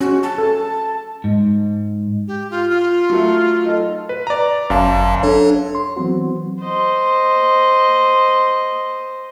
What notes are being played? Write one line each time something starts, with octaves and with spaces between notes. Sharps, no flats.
C#4 F#4
A5
A4
G#2
G4
F4
F4
F#3 A3
D#4 A4
B4
D5 A#5
G1 F#2 F5 A5
D4 A4 C#5
C6
E3 F#3 B3 C4 F#4
C5 D#5